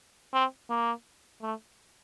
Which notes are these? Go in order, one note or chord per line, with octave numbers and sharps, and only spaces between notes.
C4
A#3
A3